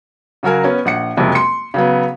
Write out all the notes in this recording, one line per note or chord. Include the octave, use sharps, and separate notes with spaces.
C#3 F#3 F#4 A#4 G#5
B3 C#4
A#1 F#5 C#7
F#1 F2 C3 G#3 C4
C6 C#7
C#3 F#3 B3